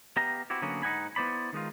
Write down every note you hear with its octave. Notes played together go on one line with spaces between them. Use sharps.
B3 G4 D#5 F5 A#5
C4 E4 F#4 G4
D3 F#3 A#3 B3 C#4
G#2 D#4 D#5 F#5 G#5 B5
B3 E4 C5 D5 B5
D#3 G#3 D#4 F4